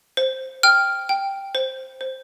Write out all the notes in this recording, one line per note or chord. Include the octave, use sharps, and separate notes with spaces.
C5
G5 F6
G5
C5
C5